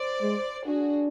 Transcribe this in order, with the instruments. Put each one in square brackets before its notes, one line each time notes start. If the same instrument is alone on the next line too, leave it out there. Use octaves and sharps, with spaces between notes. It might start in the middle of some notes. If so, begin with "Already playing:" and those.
Already playing: [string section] C5 D5
[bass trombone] G#3
[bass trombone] D4 [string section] F#4 G#4